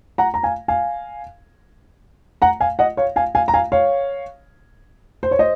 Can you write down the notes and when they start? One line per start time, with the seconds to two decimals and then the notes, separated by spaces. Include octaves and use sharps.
0.18 F#5 A#5
0.34 A#5
0.43 F5 G#5
0.68 F5 G#5
2.42 F#5 A#5
2.60 F5 G#5
2.79 D#5 F#5
2.97 C#5 F5
3.16 F5 G#5
3.35 F5 G#5
3.48 A#5
3.54 F5 G#5
3.72 C#5 F5
5.23 C5
5.31 C#5
5.39 C5 D#5